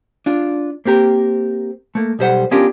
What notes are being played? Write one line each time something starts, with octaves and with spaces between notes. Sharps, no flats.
D4 F4
A#3 C4 G4 A#4
A3 A#3
B1 G3 C5 F#5
B3 C#4 D4 F4 G4 A#4